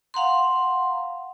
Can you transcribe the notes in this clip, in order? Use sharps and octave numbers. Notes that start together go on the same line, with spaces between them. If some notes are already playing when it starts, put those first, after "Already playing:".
F5 F#5 A#5 C6